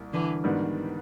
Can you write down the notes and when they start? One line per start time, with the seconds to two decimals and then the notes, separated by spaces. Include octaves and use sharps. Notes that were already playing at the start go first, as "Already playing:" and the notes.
Already playing: C2 A#2
0.13 D3 E3
0.44 G#2 D#3 G3 B3 D4